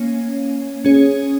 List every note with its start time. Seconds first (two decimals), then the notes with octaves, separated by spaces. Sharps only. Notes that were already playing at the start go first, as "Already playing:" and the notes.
Already playing: A#3 C#4 C#5
0.85 C#4 G#4 C#5